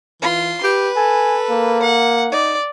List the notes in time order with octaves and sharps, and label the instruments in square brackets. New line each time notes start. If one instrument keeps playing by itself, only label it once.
[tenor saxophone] E3 [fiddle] F4 C6
[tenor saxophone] G4 [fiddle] B4
[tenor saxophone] A4 [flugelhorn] G#5
[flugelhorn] A#3
[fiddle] F#5
[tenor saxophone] D#4 [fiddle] D5